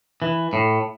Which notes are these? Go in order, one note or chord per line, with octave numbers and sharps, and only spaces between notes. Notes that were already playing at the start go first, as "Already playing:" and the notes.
E3
A2